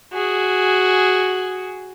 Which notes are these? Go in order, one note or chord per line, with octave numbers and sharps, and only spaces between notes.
F#4 G#4